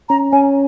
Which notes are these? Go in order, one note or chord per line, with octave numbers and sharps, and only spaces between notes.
C#4 A#5
C#4 G#5